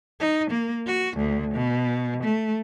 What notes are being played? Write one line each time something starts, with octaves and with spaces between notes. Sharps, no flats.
D#4
A#3
F#4
D2
B2
A3